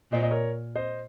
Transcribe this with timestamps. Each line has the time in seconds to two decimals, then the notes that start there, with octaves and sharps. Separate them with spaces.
0.11 A#2 C5 D#5
0.23 D#5
0.31 A#4 C#5
0.75 C5 D#5